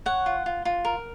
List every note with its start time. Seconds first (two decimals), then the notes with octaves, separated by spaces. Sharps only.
0.06 C#5 F#5
0.26 F4
0.46 F4
0.65 F4
0.85 A#4